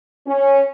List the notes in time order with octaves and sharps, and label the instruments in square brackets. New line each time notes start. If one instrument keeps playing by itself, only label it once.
[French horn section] C#4